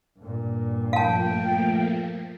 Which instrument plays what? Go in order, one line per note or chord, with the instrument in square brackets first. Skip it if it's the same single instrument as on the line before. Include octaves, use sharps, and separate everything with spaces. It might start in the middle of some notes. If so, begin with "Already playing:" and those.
[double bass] G2 A#2
[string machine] F3 A3 A#3 [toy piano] F5 A5 [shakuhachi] G5